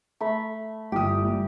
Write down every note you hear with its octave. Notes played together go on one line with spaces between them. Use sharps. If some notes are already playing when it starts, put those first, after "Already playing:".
A3 B5
G1 E3 G4 D#6
G2